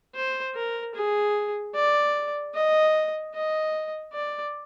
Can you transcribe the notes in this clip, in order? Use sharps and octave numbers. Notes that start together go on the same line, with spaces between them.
C5
A#4
G#4
D5
D#5
D#5
D5